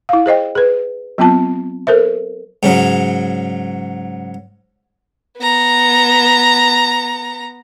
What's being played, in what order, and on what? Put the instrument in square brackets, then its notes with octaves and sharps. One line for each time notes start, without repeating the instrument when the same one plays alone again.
[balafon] E4 F5
G#4 C5 D#5 G5
G#4 B4
F#3 B3 C4 F4 A5
A4 A#4 C5 E5
[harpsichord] G#2 C#3 F#3
[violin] B3 A#5